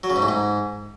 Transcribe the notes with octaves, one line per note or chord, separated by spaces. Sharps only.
F#3
C#3
G#2
A2
G#2